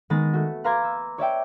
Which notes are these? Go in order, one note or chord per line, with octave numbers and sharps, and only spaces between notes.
D#3 G#3 B3 B5 A6 A#6
A3 F#4
B4 F5 A#5 C6 D6 G#6
E6
C#5 D5 E5 G5